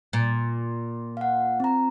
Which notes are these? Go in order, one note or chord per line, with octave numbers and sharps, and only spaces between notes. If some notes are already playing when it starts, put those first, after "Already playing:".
A#2
F5 F#5
C4 A#5